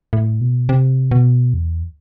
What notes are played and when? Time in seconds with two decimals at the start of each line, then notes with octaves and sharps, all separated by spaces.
0.13 A2
0.41 B2
0.69 C3
1.11 B2
1.54 E2